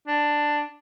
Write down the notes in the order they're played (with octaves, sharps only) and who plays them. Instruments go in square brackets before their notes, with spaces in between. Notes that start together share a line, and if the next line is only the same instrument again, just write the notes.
[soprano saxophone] D4